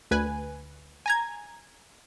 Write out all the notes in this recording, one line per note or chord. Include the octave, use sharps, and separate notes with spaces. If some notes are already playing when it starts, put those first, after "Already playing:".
D2 B4 G#5
G#5 A#5 G#6